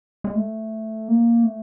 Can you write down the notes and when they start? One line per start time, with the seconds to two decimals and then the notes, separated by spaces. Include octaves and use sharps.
0.24 G#3
0.35 A3
1.08 A#3
1.44 A3